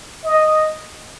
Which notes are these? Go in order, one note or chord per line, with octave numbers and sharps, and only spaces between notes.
D#5